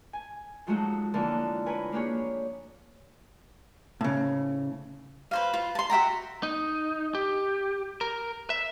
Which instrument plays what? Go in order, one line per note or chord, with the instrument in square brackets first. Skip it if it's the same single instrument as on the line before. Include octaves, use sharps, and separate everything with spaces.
[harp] G#5
F3 F#3 G#3 A3 D#4 F#4
D3 E3 F3 A#3 A4 A#4
A#4 B4 C#5 G#5
A#3 D4 G4 G#4 C#5
[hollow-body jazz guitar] A2 C#3
[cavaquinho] B4 C5 F5
F4
A5 C6
F#4 E5 G5 A#5
[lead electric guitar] D#4
G4
A#4
E5